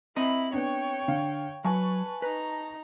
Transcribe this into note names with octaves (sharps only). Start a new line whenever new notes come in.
C4 E4 D#5 A#5 B5
B3 D4 C#5 G5
D3 F5
F#3 B4 G#5 A5 C#6
D#4 B4 A#5